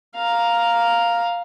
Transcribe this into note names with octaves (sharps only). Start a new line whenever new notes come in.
F5 A#5